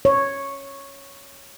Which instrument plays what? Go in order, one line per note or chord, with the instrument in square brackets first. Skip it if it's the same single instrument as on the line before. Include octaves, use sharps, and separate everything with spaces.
[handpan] C#5